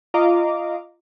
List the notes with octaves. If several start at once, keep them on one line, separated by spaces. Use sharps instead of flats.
F4 D#5 F5 A#5 D6